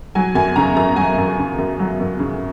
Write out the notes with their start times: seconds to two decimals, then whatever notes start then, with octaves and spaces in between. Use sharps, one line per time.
0.15 F#3 G#5
0.35 F#2 G#5
0.56 C#3 A#5
0.76 F#2 A#5
0.96 F#3 G#5
1.18 F#2
1.38 C#3
1.58 F#2
1.79 F#3
2.00 F#2
2.19 C#3